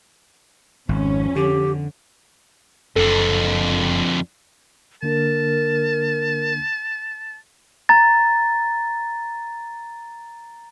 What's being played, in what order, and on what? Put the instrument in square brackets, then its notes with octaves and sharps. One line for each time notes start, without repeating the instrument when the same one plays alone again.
[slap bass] G#1 [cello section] F2 C#4
[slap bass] D3 [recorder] G4
[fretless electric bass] F#1 [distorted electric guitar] F2 D3 [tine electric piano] A4
[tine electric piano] D3 A#3 D4 [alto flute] A#4 [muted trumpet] A5
[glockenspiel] A#5 A6